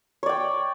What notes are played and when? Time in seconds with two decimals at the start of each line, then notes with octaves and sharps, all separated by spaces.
0.23 C#5
0.26 D5
0.29 G5